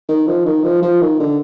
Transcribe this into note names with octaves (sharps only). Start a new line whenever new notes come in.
D#3
F3
D#3
F3
F3
D#3
D3